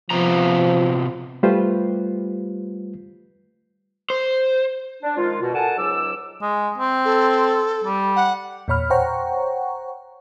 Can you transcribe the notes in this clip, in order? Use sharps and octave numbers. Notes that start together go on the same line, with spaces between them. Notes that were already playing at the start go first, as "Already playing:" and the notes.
C3 F3 B3 A#5
G3 A3 F4 G4 B4 C5
C5
D4
D#3 F3 G#3 F4
B2
A4 A#4 D5 F#5 G#5 A5
C#2 G#2 F#3 D6 E6
G#3
C4
A4
G3
F#5
E2 A#2 C#5 B5 F6
C5 C#5 F#5 G5 A#5 C#6